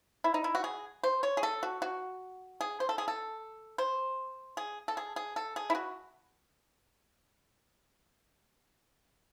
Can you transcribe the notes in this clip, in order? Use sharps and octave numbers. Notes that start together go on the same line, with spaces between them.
E4
D#4
E4
F#4
G#4
C5
C#5
G#4
A4
F#4
F#4
G#4
C5
A4
G#4
A4
C5
G#4
A4
G#4
G#4
A4
G#4
E4
F#4